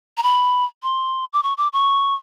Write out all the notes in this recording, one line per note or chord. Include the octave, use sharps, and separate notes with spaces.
A#5
B5
C6
D6
C#6
D6
C#6